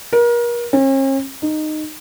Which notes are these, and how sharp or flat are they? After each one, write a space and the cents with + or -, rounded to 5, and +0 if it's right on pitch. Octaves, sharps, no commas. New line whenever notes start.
A#4 +35
C#4 -45
D#4 -15